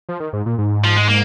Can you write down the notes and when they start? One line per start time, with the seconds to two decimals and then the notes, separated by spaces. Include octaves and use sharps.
0.09 F3
0.20 D#3
0.33 G#2
0.46 A#2
0.58 G#2
0.84 F3
0.96 G#3
1.09 A#3